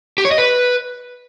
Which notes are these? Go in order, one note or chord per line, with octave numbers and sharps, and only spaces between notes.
G4
C#5
D#5
B4